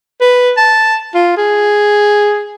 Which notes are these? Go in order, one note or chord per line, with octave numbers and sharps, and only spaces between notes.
B4
A5
F4
G#4